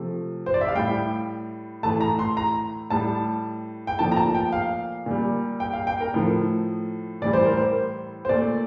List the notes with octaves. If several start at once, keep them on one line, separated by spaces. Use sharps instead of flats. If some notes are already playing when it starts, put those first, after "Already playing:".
Already playing: C3 F3 A3
C5
D5
E5
F5
A2 G3 G5
A2 E3 A3 A5
A#5
C6
A#5
A2 G3 A5
G5
A#2 F3 A3 A5
A#5
A5
G5
F5
A#2 G3
G5
F5
G5
A#4
A2 F3 A3
A2 E3 G3 D5
C5
A#4
C5
C5
A#2 A3 D5